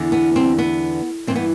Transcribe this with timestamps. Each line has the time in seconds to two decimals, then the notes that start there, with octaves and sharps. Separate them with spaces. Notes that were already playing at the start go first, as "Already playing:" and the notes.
Already playing: E2 D3
0.12 B3
0.36 C4
0.58 B3
1.27 G2 E3 C4
1.35 B3